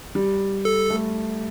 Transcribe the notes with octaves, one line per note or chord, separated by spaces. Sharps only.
G3
A4
A3